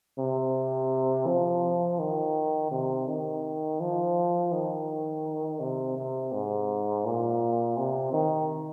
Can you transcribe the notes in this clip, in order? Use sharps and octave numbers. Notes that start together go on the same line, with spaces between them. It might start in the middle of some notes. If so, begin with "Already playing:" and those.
C3
F3
D#3
C3
D#3
F3
D#3
C3
C3
G#2
A#2
C3
D#3